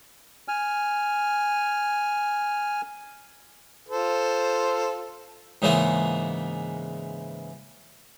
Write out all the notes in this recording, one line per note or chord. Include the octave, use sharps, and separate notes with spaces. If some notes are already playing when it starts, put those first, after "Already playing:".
G#5 F6
F4 A4 C5
G#2 C#3 E3 G#3 A#3 B3